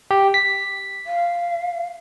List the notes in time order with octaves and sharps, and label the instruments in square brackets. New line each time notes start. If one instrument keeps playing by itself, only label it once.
[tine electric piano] G4
B6
[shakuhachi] F5